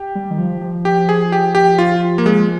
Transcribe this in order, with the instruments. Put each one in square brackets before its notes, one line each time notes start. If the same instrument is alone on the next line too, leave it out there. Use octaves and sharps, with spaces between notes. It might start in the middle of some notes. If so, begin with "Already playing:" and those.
Already playing: [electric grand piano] G4
[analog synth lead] G3
D#3
F3
F3
[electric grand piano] G4
G#4
G4
G4
F4
A#3
G#3